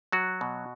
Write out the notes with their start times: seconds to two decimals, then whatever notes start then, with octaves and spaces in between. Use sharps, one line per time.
0.12 F#3 F#4
0.41 B2